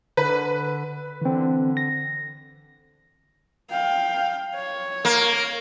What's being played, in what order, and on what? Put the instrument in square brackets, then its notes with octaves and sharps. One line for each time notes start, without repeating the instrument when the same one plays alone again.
[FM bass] D3 [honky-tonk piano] B4
[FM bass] D3 [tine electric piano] E3 C4
[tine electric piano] A#6
[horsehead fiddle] F5 G5
C#5
[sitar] A#3